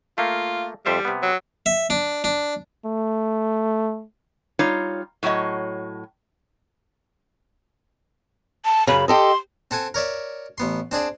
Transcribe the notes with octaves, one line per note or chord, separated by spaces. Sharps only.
A3 A#3 F4
F2 G3 C5 E5
C3 B3
F#3
E5
D4
D4
A3
G3 D#4 F4 C#5
A2 F#3 F#4 C#5 D#5
A5
F#2 C#3 B5
G4 A4 D#5 C6
C4 A4 F#5 G#5
A#4 C#5 D5 E5
A1 B3 C6
C4 D4 G#4 D5